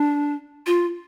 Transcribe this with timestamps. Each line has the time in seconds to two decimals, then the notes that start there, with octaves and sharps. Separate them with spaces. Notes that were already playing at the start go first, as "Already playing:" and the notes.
Already playing: D4
0.66 F4